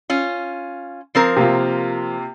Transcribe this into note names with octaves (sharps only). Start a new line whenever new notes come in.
C#4 F4
F3 C4 A#4
C3 A#3 F4